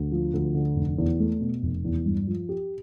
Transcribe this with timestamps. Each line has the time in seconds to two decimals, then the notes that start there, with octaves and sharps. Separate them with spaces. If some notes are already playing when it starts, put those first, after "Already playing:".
Already playing: D2
0.12 F3
0.33 D2
0.54 D3
0.76 F1
0.98 E2
1.20 A3
1.41 B2
1.63 F1
1.85 E2
2.05 G2
2.27 F3
2.49 G4